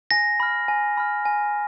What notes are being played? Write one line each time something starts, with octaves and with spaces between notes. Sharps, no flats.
G#5 A#6
B5 F6
G#5
B5 F6
G#5